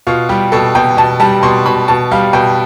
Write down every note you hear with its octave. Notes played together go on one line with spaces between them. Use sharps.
B2 F4
G3 G4
B2 A4
B2 G5
B2 A5
G3 A5
B2 C6
B2 B5
B2 A5
G3 F5
B2 G5